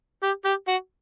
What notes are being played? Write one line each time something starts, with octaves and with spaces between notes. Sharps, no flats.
G4
G4
F#4